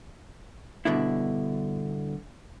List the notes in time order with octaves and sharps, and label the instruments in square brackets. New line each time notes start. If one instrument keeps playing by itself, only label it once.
[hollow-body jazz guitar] G2 B2 D3 E4